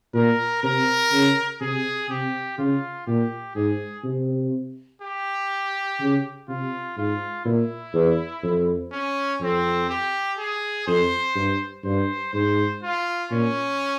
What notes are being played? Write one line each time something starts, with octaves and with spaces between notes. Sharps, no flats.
A#2 A#4
C3 A#4
C#3
C3 G#4
C3 G4
C#3 F4
A#2 G4
G#2 G#4
C3
G4
C#3
C3 F4
G#2 F4
A#2 E4
E2
F2
C#4
F2 C4
G4
G#4
F2 C5
G2
G2 C5
G#2 C5
F4
A#2 C#4